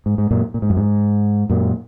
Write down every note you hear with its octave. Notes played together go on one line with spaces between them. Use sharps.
G#2
G#2
F#2 A#2
A#2
G#2
F#2
G#2
F#2 A#2